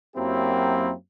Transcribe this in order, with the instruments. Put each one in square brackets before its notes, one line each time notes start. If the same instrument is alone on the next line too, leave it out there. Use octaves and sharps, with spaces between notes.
[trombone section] F#2 F#3 A#3 C4 E4 G4